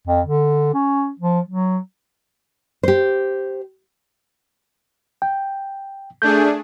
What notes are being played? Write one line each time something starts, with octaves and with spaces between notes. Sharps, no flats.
F2
D3
C#4
F3
F#3
G4 C5
G5
A3 D4 G#4 G6